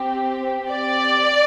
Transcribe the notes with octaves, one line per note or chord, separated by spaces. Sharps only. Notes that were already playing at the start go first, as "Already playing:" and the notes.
Already playing: C4 G4
D5